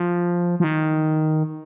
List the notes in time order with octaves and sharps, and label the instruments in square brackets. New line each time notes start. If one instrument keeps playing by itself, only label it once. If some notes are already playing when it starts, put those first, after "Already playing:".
Already playing: [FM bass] F3
F3
D#3